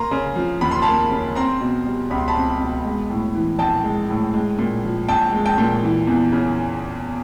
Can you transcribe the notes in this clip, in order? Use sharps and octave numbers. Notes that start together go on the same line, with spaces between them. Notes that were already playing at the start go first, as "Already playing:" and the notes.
Already playing: A#3 A#5 C6
C#3
F3
D#2 B5
C6
A#3 A5 B5
C#3
C4 A#5 C6
B2
G3
C#2 B5
C6
A5 B5
C4
B2
G#3
A2
E3
A#1 G5 A5
G#3
A2
G#3
A#2
F3
A#1 G5 A5
G#3
G5 A5
A#2
E3
E2
C#3